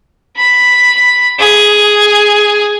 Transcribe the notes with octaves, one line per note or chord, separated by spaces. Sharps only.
B5
G#4